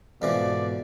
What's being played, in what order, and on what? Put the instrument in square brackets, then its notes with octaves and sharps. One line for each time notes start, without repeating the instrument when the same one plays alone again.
[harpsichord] F2 E3 F3 [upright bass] G#2 [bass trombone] B2 [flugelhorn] D5